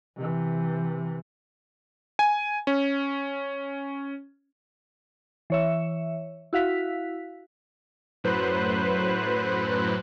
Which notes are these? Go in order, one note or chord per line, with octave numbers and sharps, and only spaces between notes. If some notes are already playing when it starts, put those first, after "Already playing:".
C3 E3
G#5
C#4
E3 C#5 E5
E4 F#4 F5 B6
F#2 A2 F#3 B4 C5 F#6